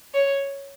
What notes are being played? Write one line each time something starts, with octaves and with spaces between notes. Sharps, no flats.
C#5